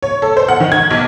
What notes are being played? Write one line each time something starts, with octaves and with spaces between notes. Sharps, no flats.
C#5
A4
C5
F#5
D#3
G#6
B1